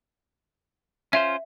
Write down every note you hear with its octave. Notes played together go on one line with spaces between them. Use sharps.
C#4 F4 C5 E5